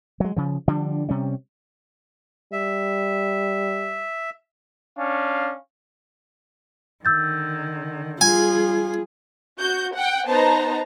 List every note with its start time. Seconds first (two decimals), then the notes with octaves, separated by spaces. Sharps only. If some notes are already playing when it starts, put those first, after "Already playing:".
0.20 F#3 G#3
0.36 C#3 F3
0.68 D3 F3 G3 D4
1.09 C3 G3 C#4
2.53 G3 E5
4.97 C#4 D4 F5
7.05 D3 D#3 E6 G6 A6
8.21 G3 F4 G#4 G#5
9.60 F#4 G6
9.96 F#5 G5
10.27 B3 D#4 C5 A5 A#5